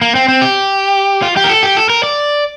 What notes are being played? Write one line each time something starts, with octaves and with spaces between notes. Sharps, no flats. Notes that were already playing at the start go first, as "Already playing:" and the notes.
A#3
C4
C4
G4
F4
G4
A#4
A4
G4
A4
A#4
D5